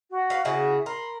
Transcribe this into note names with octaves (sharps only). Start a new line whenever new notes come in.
F#4
B4 F5
C#3 E4 F#4 G#4
A#4 B5 C6